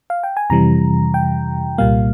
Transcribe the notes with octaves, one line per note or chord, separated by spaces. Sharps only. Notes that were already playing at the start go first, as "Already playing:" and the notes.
F5
G5
G#5
F2 C3 E3 G3 A#5
G5
C2 A#2 G3 A#3 F5